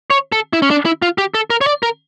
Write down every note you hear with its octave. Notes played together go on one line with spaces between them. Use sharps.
C#5
A4
E4
C#4
D4
E4
F4
G4
A4
A#4
C#5
D5
A#4